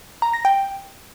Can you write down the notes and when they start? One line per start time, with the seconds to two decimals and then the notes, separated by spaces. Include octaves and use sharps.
0.22 A#5
0.33 A#6
0.45 G5